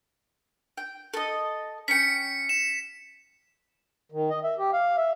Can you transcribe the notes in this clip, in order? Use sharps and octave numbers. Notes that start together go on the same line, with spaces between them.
G5
A4 D#5
C#4 G5 B6 C#7
E7
D#3
D#5
E5
G4
F5
E5